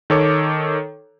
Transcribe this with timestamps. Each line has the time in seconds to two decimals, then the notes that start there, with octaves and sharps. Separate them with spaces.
0.10 D#3 A4 C#5 D6